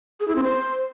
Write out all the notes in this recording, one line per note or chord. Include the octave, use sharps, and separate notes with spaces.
G#4
E4
C4
C5